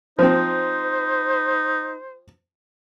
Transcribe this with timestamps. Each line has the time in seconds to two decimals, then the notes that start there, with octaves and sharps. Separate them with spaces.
0.19 F3 C4 D#4 C5